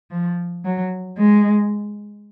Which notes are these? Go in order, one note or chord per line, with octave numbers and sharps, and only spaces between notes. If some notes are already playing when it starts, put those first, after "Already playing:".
F3
F#3
G#3